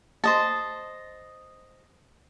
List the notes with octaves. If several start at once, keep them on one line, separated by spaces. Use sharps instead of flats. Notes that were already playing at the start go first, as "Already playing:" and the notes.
C5 D#5 A5